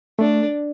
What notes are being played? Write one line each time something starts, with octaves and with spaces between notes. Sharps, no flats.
A3 D4